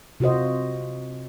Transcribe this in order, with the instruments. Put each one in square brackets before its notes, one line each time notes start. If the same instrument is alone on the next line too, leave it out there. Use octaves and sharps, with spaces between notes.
[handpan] C3 F4 F#4 C5 D#5